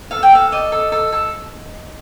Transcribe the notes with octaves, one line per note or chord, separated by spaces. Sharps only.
A4 F5
G5
A4 F5
D5 D#5
A4
A4
A4